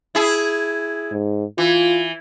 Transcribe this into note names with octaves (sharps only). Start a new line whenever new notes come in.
E4 G#4
G#2
E3 F4